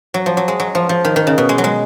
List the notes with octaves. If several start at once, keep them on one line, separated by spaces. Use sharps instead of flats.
F#3
F3
F#3
G#3
F#3
F3
F3
D#3
D#3
C#3
B2
G#3
F#3
G#3